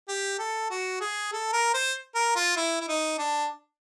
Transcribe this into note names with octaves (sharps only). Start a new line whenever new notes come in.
G4
A4
F#4
G#4
A4
A#4
C5
A#4
F4
E4
E4
D#4
D4